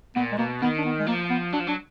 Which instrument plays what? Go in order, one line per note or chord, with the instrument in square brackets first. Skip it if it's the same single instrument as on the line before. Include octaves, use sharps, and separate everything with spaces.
[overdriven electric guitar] A#2 [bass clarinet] B3
[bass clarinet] G#3
[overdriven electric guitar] B2 [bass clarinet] A#3
[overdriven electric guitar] D#3 [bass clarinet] B3
[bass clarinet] D4
B3
G#3
[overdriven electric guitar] F3 [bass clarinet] A#3
[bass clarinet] B3
[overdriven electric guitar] F#3 [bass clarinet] D4
[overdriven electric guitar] F3
[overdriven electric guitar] F#3 [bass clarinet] D4